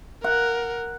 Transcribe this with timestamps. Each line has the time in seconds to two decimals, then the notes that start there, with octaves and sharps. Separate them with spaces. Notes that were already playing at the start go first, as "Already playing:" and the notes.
0.24 A#4 F#5